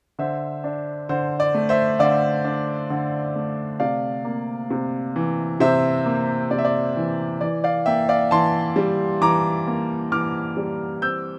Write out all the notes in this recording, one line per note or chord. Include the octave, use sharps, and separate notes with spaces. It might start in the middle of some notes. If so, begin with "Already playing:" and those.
D3 C5 E5
D4
D3 C5
D5
A3
C5 E5
D3 D5 F5
D4
D3
A3
C3 D5 F5
A#3
C3
E3
C3 C5 E5
A#3
C3 D5
E5
D5
E3
E3 D5
D5 F5
A#3 E5 G5
D5 F5
E3 A5 C6
G3
E3 A#5 D6
A#3
E3 D6 F6
G3
C4 E6 G6